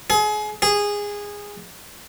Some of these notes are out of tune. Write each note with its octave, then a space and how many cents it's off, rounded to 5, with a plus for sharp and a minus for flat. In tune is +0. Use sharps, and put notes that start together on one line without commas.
G#4 +30
G#4 -15